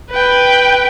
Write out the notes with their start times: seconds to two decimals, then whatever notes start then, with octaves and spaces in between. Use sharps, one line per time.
0.11 B4 G5